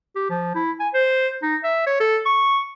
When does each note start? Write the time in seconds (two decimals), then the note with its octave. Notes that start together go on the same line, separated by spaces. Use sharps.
0.16 G4
0.30 F3
0.55 E4
0.80 G#5
0.94 C5
1.43 D#4
1.64 E5
1.87 C#5
2.00 A4
2.26 C#6